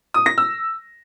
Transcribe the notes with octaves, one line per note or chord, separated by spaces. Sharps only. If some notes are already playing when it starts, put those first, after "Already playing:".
D#6
A#6
E6